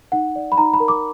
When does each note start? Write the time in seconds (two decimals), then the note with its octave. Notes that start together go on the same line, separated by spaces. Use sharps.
0.12 D#4 F#5
0.36 D5
0.52 B5
0.58 D#4 A#5
0.74 B5
0.80 A#4
0.88 D6